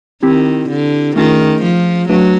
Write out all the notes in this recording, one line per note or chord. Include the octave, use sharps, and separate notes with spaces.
D#3 C4 E4 G4
D3
D#3 A3 C#4 F4 G#4
F3
F#3 A3 D4 F#4 B4